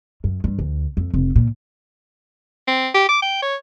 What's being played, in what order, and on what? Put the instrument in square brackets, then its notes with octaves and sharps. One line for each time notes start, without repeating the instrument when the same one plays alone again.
[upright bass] F#2
G2
D2
F2
F1
A#2
[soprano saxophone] C4
G4
D6
G5
C#5